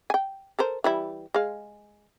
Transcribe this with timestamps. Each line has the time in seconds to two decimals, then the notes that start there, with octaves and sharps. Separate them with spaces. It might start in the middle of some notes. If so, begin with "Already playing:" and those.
0.10 G5 G#5
0.59 A4 A#4 C5
0.84 E3 G3 E4
1.34 G#3 F5